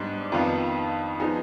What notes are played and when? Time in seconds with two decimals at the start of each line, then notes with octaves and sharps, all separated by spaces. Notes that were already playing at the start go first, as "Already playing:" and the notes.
Already playing: G#2 G3 B3 D4
0.32 F2 D#3 B3 F4
1.20 F3 B3 D#4 G#4